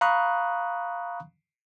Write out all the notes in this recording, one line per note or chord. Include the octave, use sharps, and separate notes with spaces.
F5 A#5 B5 C#6 D#6 F#6